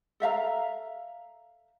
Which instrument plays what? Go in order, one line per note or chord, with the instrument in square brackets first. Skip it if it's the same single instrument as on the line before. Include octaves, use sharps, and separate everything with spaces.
[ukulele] A4 E5 F5 A#5